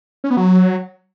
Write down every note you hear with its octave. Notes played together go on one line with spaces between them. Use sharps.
C#4
B3
F#3